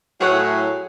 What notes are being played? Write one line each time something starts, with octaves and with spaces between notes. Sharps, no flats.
A2 F#3 G#4 C#5 F#5